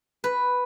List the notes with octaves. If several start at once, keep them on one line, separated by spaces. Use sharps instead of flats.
B4